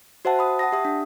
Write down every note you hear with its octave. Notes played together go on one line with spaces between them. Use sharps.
F#4 C5 E5 F#5 A5
B5 D#6
F#5 A5 D#6 A#6
G4 E5 D#6
D4